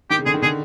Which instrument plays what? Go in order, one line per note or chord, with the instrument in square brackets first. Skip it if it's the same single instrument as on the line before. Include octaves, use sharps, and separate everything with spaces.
[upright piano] D#3 [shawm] G4
[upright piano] C#3
[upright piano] D3 [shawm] G#4
[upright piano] D#3
[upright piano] D3 [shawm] G#4